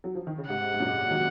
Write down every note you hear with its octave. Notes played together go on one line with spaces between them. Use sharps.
F#3
F3
D#3
C#3
G#2 C3 F#5
G#2
F#2 A#2
D#3 F#3